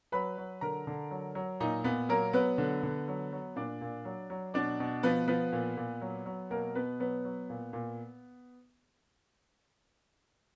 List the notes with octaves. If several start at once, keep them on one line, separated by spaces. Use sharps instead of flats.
F#3 B4 B5
F#3
D3 A#4 A#5
D3
F#3
F#3
A#2 D#4 D#5
A#2 B3 B4
F#3 A#3 A#4
F#3 B3 B4
D3
D3
F#3
F#3
A#2 D4 D5
A#2
F#3
F#3
B2 D4 D5
B2
F3 B3 B4
F3 B3 B4
A#2
A#2
F#3
F#3
B2 A#3 A#4
B2 B3 B4
F#3 B3 B4
F#3
A#2
A#2